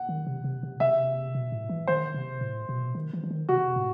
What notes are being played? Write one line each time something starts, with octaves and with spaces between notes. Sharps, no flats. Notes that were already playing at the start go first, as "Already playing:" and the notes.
Already playing: F#5
D#3
C3
C3
C3
C3 E5
B2
A2
E3
D#3 C5
C3
A2
B2
D#3
E3
E3
D#3
C3 F#4
A2